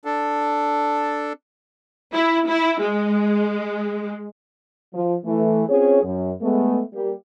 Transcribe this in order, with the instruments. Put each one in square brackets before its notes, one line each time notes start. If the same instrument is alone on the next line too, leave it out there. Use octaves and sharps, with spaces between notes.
[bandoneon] D4 A4
[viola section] E4
E4
G#3
[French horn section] F3
E3 A3
C4 C#4 F4 G#4 C#5
F#2
G#3 A3 B3
G3 A#3 G4